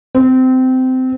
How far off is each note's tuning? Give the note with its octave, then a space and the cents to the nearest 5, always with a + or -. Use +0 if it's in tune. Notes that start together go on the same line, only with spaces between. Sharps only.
C4 -20